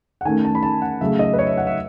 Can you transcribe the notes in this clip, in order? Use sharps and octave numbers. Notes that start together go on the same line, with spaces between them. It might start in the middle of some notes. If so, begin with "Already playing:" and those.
F#5
D#3 A3 C#4 G#5
A5
B5
A5
F#5
C#3 F#3 A3 E5
D#5
B4
C#5
E5
F#5
E5